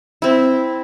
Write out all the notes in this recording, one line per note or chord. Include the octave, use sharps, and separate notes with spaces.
C4 E4